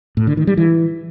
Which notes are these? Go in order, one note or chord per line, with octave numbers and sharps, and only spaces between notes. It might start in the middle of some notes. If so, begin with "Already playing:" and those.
A2
D3
D#3
G3
E3